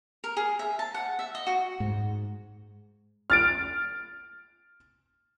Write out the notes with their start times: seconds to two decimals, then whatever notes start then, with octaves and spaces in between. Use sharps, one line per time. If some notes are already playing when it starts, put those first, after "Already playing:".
0.24 A#4
0.37 G#4
0.59 E5
0.79 A5
0.94 F#5
1.19 E5
1.35 D#5
1.47 F#4
1.80 G#2
3.30 F6 A6 D7